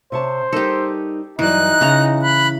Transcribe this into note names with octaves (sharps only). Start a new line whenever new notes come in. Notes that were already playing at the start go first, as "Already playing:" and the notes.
C3 C5 C#5 A5
G3 D#4 G4 A4 A#4
G2 E3 F#3 D#4 D5 F#6
C#3 E3 A#5
B5 F#6